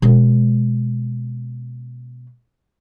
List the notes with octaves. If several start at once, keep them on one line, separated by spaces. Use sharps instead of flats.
B2 G#3